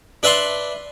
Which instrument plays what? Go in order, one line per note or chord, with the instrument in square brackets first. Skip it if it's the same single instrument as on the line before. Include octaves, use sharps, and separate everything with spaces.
[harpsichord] D4 B4 E5 A5 C6